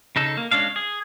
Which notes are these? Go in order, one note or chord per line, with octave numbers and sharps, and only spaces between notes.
C#3 D#4 A4
A#3
G#3 C#4 D4 F5
G#4